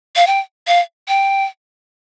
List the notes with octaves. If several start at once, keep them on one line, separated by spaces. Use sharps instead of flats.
F5
G5
F5
G5